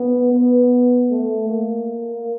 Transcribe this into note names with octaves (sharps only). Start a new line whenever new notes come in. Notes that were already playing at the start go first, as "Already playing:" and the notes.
Already playing: B3
B3
A3
A#3